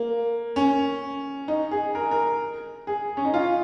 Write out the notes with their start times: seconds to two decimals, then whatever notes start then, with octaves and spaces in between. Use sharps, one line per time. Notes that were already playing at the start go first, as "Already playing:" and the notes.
Already playing: A#3
0.56 C#4
1.48 D#4
1.71 G#4
1.95 A#4
2.11 A#4
2.87 G#4
3.17 C#4
3.25 D#4
3.34 F4